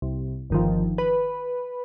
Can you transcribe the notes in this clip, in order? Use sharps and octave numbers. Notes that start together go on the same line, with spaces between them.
C2
G1 D#3 F3
B4